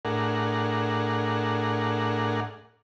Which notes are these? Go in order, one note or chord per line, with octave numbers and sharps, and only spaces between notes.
A2 D4 G#4 A#4 F#5